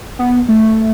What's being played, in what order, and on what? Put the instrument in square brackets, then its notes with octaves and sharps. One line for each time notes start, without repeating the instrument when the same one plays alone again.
[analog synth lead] B3
A3